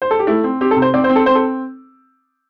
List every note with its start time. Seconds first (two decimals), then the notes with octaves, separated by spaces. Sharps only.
0.02 C5
0.11 A4
0.19 G4
0.27 A3 E4
0.44 C4
0.61 C4 G4
0.71 A4
0.77 C3
0.82 C5
0.94 C4 D5
1.04 C5
1.10 C4
1.16 A4
1.26 C4 C5
1.35 A4